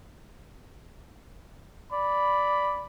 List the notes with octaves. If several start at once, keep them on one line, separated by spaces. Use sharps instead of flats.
D5 B5